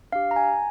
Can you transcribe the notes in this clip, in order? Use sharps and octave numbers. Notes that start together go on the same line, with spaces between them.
D4 G4 F5
A#5
G#5